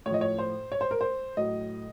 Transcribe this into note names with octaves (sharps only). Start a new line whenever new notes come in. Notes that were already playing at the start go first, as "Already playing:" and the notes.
A2 F3 C#5 D#5
C#5
C5
C#5
C5
A#4
C5
A2 F#3 D#5